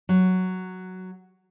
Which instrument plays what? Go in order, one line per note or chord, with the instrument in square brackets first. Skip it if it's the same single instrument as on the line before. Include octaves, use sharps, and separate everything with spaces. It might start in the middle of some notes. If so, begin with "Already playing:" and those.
[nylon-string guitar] F#3